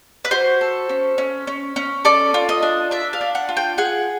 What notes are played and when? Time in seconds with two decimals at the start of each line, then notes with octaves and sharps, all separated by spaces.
0.25 B4
0.31 F#4 C5
0.61 A4
0.89 C#4
1.18 C#4
1.47 C#4
1.76 C#4
2.05 A4 D5
2.34 F4
2.49 D#5
2.62 D4
2.91 D4 E5
3.13 F5
3.21 D4
3.35 F#5
3.49 F4
3.57 G5
3.78 G#4 F#5